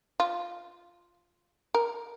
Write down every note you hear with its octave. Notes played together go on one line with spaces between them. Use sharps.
F4
A#4